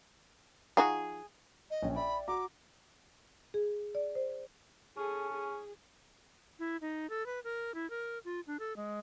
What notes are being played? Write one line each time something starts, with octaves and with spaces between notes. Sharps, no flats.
F3 D#4 F#4 G#4
D#5
A#1 C#4 G5
D5 E5 G5 B5
F#4 A#5 D6
G#4
D5
C5
C#4 G#4 A4
G#4
E4
D#4
A4
B4
A#4
E4
A#4
F4
D4
A4
G#3